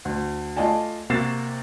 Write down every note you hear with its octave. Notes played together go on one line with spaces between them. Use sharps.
D2
A3 F4 D5 D#5 G#5 A5
C3 A#3 F#4 A6 C7 E7